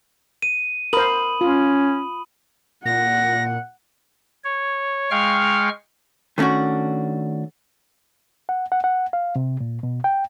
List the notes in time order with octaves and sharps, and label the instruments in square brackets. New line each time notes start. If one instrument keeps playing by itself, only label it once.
[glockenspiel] D#7
[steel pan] A#4 C5 [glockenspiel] B5 D#6 F#7
[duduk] C#4 [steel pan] F4
[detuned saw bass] A#2 [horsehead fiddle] F#5 [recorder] A#6
[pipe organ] C#5
G#3 F5 G5 C#6 F6
[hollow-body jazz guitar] D#3 A3 C#4 D4 F#4
[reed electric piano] F#5
F#5
F#5
F5
C3
A#2
B2
G5